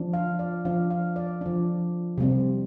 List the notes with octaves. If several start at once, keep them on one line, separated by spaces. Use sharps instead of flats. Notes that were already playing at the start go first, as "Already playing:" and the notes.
Already playing: F3 D4
F5
D5
F3 D4 F5
F5
D5
F3 D4
C3 G3 C4